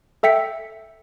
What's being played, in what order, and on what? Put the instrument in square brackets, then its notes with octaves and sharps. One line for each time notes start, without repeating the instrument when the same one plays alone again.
[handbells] A4 E5 G5 B6 C#7